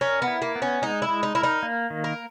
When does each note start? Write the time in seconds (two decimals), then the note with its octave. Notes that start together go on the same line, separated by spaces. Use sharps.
0.01 C#4 A#4
0.22 B3
0.27 E4
0.42 A#3
0.56 B3
0.62 C#4
0.82 G#3 D#4
1.02 E4
1.09 G#3
1.23 D#4
1.35 E4 A#4
1.43 D#4
1.63 A#3
1.90 D#3
2.04 A#4